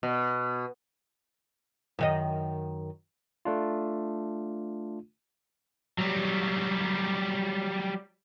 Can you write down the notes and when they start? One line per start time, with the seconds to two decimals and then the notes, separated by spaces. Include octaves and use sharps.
0.03 B2
1.99 F#2 D#3 D#5
3.45 A3 D4 F4
5.98 F#3 G3